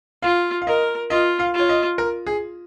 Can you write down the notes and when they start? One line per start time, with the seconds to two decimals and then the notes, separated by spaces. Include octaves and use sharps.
0.22 F4 F5
0.62 F5
0.67 A#4 D#5
1.10 F4 D#5
1.40 F5
1.54 F4
1.60 C#5
1.69 D#5
1.98 A#4
2.27 G#4